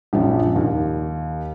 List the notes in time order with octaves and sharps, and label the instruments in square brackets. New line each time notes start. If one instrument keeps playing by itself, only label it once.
[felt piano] A#1 F#2 F3 D4
D#2